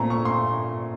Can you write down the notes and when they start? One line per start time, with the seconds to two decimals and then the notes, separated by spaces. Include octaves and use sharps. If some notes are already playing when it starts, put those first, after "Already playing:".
Already playing: A#2 A3 C4 A#5
0.10 C#6
0.25 C6